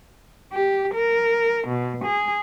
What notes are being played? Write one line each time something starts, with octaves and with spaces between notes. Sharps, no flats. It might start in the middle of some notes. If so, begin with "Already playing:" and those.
G4
A#4
B2
G#4